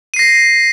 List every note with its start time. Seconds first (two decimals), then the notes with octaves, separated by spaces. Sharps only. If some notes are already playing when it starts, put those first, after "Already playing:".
0.14 D#7
0.16 C7
0.19 A#6